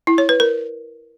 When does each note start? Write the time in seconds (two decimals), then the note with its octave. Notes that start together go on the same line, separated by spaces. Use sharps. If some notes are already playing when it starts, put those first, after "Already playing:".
0.07 E4
0.18 C#5
0.29 B4
0.40 A#4